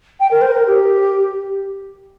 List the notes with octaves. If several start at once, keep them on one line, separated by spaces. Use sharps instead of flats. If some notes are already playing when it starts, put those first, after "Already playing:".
G5
A#4
C5
A#4
G4